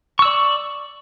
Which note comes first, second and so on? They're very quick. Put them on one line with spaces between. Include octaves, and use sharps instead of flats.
C#6 E6 D5